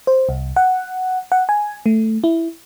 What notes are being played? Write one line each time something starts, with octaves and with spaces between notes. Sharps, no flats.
C5
C2
F#5
F#5
G#5
A3
E4